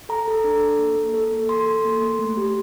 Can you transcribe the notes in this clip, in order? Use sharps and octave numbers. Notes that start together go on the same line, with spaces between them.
A4 A#5
A4
D4
A4
A#3
A#3
A4
A#3
A4 C6
A4
A#3
A#3
A3
G4